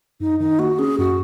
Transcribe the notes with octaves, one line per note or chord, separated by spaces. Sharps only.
F#2 D#4
D#3 D#4
A#3 F#4
C#4 G#4
F#2 F#4